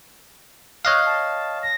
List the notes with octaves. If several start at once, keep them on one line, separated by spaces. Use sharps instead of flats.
C#5 D#5 F5 F#6
A5
A#6